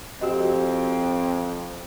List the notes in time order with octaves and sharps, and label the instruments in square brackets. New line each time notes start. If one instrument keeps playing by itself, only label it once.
[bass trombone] F2 [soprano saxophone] C4 [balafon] F#4 G4 D#5